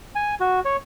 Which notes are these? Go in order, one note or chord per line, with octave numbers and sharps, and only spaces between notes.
G#5
F#4
C#5